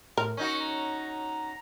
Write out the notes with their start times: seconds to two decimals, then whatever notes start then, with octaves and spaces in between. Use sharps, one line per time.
0.17 A2 A#4
0.37 C#4 D#4 F#4 C#5
0.60 A#5